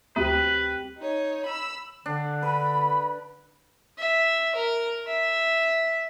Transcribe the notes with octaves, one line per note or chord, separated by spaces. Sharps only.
D2 C4 G4 B4
D#4 C#5
B5 E6
D3 D4
B4 B5
E5
A#4
E5